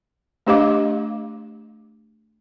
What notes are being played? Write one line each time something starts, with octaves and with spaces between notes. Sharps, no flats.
A3 D4 G4 D#5 F5 D6